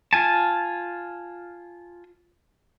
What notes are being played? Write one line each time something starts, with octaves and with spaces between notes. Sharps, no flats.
F4 G#5 A5